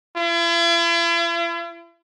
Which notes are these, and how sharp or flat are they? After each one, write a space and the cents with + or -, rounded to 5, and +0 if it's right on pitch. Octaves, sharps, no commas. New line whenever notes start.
E4 +45